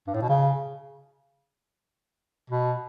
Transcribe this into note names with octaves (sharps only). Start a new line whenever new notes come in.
G2
A2
B2
C#3
B2